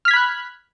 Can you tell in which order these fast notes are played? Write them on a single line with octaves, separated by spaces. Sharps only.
F6 B6 G#6 B5 F#6